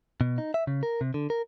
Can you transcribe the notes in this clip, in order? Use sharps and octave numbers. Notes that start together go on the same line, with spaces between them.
B2
D#4
E5
C#3
A#4
C3
D3
A#4